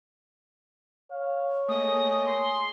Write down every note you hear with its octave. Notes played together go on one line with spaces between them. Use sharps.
C#5 F5
A3 A#3 G#4 D#5 D#6
C6